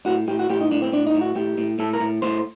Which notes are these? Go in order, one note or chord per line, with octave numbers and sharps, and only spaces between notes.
A2 F#4
A2 G4
F#4
A2 G4
D#4
A2 D4
C4
A2 D4
D#4
A2
F#4
A2 G4
A2
A2 A4
A#4
A2
A2 C5